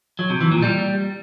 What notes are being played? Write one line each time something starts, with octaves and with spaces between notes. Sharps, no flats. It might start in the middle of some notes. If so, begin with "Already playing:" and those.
F#3
C3
E3
A#2
G3